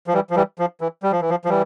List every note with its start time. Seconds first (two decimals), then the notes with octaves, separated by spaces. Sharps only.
0.07 F3
0.13 E3 G3
0.30 F3
0.36 E3 G3
0.59 F3
0.81 E3
1.03 G3
1.12 F3
1.21 E3
1.30 F3
1.45 F3
1.49 E3 G3